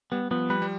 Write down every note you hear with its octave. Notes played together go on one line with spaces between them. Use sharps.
G3 B3
F3 B3
G3 B4
G3